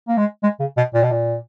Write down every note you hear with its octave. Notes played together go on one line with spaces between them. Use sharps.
A#3
G#3
G#3
C#3
B2
A#2
B2
A#2